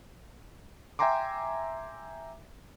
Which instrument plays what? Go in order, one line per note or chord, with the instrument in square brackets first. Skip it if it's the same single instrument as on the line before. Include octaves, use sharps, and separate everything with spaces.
[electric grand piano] E5 G5 G#5 A#5 C6 D6